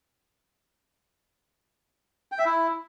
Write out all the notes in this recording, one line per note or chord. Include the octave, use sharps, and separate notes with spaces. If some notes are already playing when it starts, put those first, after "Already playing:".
G5
E5
E4